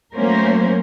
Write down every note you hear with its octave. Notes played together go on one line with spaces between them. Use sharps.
F#3 A3 A#3 C#4 A#4 C5